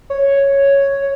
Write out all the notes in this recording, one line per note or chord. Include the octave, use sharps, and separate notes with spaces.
C#5